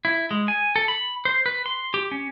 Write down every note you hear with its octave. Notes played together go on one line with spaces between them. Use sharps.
E4
G#3
G#5
A4
B5
C5
B4
C6
G4
C#4